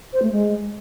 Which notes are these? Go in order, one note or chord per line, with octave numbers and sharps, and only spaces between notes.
C5
A3
G#3